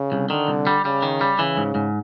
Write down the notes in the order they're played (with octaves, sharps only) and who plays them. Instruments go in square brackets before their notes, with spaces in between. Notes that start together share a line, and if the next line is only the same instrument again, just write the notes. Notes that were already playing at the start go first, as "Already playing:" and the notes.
Already playing: [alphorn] C#3
[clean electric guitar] C2
[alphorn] D3 [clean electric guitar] D#3
[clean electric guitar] C2
G3
[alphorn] C#3 [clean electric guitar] G3
[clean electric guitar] D#3
G3
[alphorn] C#3 [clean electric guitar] E3
[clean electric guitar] G#2
G#2